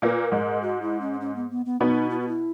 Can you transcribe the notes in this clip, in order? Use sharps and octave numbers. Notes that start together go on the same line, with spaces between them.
A#2 A#3 B4
G#2 G#3 A#4
F#4
E4
C#4
C#4
B3
B3
B3
B2 B3 D#4
E4
F#4
E4